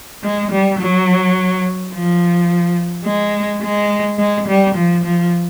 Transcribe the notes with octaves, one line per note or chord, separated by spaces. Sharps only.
G#3
G3
F#3
F3
G#3
G#3
G#3
G3
F3
F3